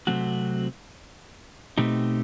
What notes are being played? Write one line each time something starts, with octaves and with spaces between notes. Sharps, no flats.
C3 F#3 A3 C4 F#4
B2 A3 C4 D#4 G4